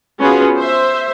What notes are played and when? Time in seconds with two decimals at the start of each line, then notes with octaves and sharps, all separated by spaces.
0.20 B3 C#4 F4 F#4 G#4 B4
0.57 C5 E5